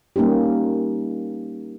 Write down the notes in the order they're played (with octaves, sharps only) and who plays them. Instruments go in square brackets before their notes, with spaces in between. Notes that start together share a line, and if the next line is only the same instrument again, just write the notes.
[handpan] G3 A#3 C#4 D#4 G4